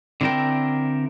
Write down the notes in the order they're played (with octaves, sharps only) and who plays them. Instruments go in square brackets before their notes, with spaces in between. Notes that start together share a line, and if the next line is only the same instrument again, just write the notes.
[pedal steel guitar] D3 C4 E4 A#4 G5